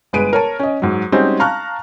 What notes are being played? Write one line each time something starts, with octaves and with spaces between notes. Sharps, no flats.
G1 G#3 B4 D7 D#7
A#4 C#5 A5
C#4 D#5
G#2 F#3
G3 G#3 C4 C#4 D#4 F#4
F5 A5 A#5 C#6 F6 F#6